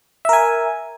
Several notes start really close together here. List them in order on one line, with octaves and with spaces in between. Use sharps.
E5 A#4 G#5